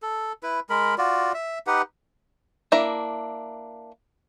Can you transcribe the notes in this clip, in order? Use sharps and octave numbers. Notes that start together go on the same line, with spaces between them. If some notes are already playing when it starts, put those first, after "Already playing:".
A4
E4 B4
G#3 A#4 B5
F4 F#4 D5
E5
D#4 G4 B4 F#5
A#3 D4 E4 E5 A#5